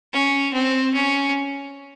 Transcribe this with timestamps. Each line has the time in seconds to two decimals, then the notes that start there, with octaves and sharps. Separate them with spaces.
0.13 C#4
0.53 C4
0.94 C#4